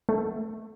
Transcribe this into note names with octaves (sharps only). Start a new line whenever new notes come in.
A3